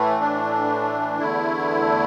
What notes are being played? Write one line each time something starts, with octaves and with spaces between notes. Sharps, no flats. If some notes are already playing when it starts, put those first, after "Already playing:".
Already playing: A2 E3 A3
D4
E2 D3 A3 E4